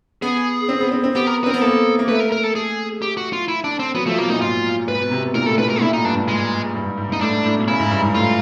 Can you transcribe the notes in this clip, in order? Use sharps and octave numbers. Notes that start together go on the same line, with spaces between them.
B3 G#4
C4
B3
C4
C4
B3 G4
A#4
C4 B4
B3 A#4
A#3 A4
A#3
A3 B4
A#4
A#4
A4
G#4
G4
F#4
F4
E4
D4
C4
F#3 B3
F3 A3
B2 A#3
A#2 D#4
G#2 F4
G#2 B4
B2
C3
B2
A#2 A#4
A2 A4
A#2 B4
B2 A#4
A#2 E4
A2 D#4
G2 D4
G#2
G#2 G#3
G2
G#2
G#2
G#2 D#4
A2 D4
A2
B2
C#3 E4
G#2
G2
G#2
A2 F4